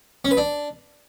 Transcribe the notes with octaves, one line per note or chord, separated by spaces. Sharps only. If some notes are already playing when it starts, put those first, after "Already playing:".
C#4
B4
D4